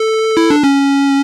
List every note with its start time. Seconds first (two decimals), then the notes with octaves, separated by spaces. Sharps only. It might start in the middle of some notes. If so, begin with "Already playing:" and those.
Already playing: A4
0.37 E4
0.50 D4
0.63 C#4